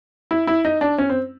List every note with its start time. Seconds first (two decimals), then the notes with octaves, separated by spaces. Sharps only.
0.31 E4
0.47 E4
0.65 D#4
0.81 D4
0.98 C#4
1.09 C4